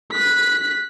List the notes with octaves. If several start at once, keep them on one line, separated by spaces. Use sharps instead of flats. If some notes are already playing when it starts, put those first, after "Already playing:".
F#6 B6